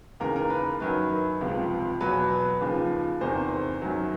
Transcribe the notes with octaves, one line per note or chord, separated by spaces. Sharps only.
D#2 C#3 E3 A#4
A#4
B4
F#2 D#3 F#3 B4
C#2 C3 F3
E2 B2 F#3 B4
D#2 C#3 F3
E2 C3 D#3 C5
F#2 D#3 F#3